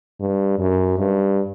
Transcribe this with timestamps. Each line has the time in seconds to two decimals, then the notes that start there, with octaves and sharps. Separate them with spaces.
0.20 G2
0.59 F#2
0.99 G2